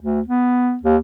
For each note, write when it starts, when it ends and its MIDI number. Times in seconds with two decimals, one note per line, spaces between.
0.02 0.21 38
0.28 0.77 59
0.83 0.97 39